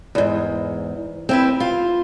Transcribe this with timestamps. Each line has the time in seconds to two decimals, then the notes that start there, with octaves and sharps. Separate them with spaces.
0.15 E2 G#2
1.29 C4 E4 B4
1.60 F4